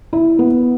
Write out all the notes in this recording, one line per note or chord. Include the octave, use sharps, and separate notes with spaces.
E4
B3